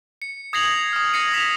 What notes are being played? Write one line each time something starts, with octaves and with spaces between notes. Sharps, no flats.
C#7
D#6 G#6 A#6 C7 F7 F#7
D#6 F6
D#6 A#6 C7 C#7 D#7
D#6 B6 E7 F7